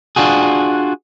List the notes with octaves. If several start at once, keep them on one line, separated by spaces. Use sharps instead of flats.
D4 F4 F#4 G#4